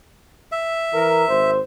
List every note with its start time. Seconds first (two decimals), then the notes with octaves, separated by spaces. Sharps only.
0.52 E5
0.94 E3 A#4
1.29 G#1 C5